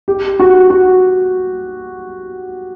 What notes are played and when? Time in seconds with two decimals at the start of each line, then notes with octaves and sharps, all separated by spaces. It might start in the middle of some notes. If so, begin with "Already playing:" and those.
0.08 G4
0.40 F#4
0.70 F#4